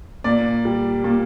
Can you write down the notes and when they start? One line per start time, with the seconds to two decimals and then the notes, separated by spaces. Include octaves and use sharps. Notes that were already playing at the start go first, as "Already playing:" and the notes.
0.24 A#2 D5
0.65 G3
1.04 A#2